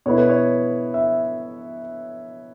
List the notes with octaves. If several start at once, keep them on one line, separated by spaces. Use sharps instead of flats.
B2 B3 E4 C#5
B4
C#5
E5